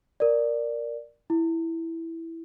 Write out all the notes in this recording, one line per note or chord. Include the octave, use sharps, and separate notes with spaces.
A#4 D5
E4